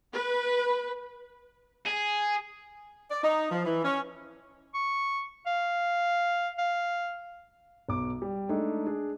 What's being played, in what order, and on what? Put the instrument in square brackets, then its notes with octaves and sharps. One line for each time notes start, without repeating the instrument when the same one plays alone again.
[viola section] B4
[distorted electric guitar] G#4
[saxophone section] D5
D#4
F3
E3
C#4
[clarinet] C#6
F5
F5
[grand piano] B1 D6
G3
G#3 A3 D4 D#4 G#4
D4 G#4